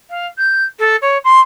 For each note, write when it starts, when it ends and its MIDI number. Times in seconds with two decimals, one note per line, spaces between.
0.10 0.27 77
0.38 0.64 91
0.79 0.96 69
1.02 1.18 73
1.24 1.40 84